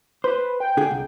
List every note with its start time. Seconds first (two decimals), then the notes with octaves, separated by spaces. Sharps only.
0.24 B4 C5
0.60 G5
0.77 D3 G#4
0.91 C2